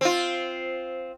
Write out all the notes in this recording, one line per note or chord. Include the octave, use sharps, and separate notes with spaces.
C4 F4